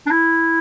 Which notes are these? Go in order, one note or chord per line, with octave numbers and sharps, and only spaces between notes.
D4
E4